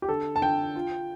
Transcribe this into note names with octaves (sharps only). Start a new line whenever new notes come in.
G4
D3 A4
A5
D3 G5
F4